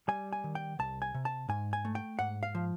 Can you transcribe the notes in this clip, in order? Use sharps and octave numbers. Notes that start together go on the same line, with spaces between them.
G3 G#5
G#5
D#3
G5
C2 A5
G#5
C3
A5
G#2 G#5
G#5
A3
G5
G#2 F#5
F5
F3